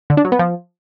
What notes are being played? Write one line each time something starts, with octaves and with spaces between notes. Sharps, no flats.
D3
D4
F#3
B3
F3